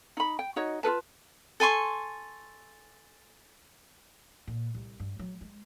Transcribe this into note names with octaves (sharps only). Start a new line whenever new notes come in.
D#4 B5
G5
D#4 F#4 C#5 D#5
F4 A4 B4 A5
A4 G#5 C6 C#6
A#2
C2
G2
F#3
G#3